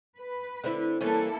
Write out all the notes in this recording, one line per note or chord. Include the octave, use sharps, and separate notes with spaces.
B4
D3 C4 E4
E3 G3 A#3 C#4 E4 A4